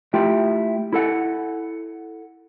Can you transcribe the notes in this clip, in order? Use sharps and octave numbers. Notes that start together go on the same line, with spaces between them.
A3 E4 F4 G4 G5
E4 A4 F#5